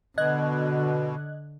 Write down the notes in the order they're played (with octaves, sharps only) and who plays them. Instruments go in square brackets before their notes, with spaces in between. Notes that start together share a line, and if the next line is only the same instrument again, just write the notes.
[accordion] B2 [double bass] D3 [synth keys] D#5 F#6 G#6